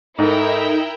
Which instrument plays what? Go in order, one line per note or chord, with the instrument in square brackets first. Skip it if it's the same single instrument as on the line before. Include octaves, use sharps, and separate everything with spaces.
[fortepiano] G#2 [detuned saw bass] D#4 [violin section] E4 A#4 G5 [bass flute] A4